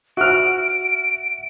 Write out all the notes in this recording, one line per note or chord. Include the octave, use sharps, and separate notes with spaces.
F#4 E5 F#5 F6 D7